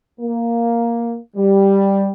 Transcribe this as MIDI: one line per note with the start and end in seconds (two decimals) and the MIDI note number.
0.20 1.17 58
1.36 2.11 55